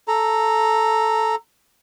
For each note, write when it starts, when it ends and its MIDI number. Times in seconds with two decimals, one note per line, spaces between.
0.08 1.35 69
0.08 1.35 82